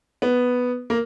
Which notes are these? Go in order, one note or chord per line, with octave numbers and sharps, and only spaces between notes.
B3
A#3